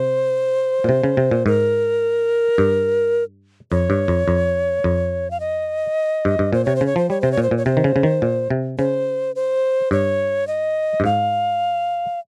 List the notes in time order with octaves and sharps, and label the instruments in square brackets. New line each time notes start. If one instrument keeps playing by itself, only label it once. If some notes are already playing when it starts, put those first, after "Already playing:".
Already playing: [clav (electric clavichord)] C3 [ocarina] C5
[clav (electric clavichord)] A#2
C3
C#3
C3
A#2
[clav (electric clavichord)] G#2 [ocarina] A#4
[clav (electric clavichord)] G2
[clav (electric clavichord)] F2 [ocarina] C#5
[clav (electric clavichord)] G2
F2
F2
F2
[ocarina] F5
D#5
[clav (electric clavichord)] G2
G2
[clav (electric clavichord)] A#2 [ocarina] C5
[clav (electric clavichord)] C3 [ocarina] C#5
[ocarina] C5
[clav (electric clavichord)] C#3
[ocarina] C#5
[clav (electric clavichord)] F3 [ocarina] C5
[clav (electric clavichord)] G3 [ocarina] C#5
[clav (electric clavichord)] C3 [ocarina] C5
[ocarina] C#5
[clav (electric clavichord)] A#2
[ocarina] C5
[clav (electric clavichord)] A#2
[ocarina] C#5
[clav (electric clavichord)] C3 [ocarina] C5
[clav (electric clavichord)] D#3
C#3
C#3
D#3
A#2
C3
[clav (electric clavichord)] C#3 [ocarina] C5
[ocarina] C5
[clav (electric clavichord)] G2 [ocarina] C#5
[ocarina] D#5
[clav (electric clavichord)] G2
[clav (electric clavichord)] G#2 [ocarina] F5